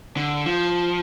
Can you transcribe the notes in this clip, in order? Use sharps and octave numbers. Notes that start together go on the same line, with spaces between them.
D3
F3